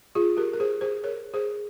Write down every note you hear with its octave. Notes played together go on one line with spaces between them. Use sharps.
F4 G#4
G4 A#4
A#4
G#4 C5
G#4 C5
A#4 C#5
G#4 C5